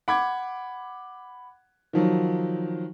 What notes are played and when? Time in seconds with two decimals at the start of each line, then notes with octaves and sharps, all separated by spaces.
0.08 F#5 B5 D6 G#6
1.93 D#3 F3 F#3